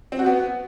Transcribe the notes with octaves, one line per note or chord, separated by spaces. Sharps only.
C4
F#4
B3